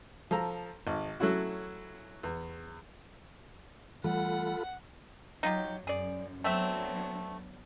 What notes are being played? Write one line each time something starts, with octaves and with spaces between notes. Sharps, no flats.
F3 A4 A#5
G#1
F#3 A3 C#4 E4 F#4
E2
E3 G3 A3 F4 A4 F#5 B5
F#3 D#4 F4 G4
F#2 G#4 D5
F#3 A3 B3 C4 D4 E5